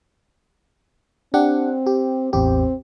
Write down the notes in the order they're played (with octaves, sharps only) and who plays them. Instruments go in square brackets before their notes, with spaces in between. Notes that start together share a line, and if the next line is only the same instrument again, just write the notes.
[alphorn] C4 [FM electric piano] D4 G4 F#5
[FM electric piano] G4
[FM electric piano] A1 E2 G4 [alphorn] C4